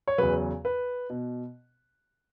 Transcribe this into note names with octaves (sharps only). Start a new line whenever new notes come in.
C#5
E2 C#3 F#3 B4
B4
B2